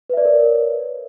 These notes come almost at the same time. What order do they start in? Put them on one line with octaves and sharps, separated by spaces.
B4 E5 D5 C#5 A#4